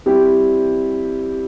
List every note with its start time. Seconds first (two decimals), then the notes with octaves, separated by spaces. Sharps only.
0.06 G3 C4 E4 G4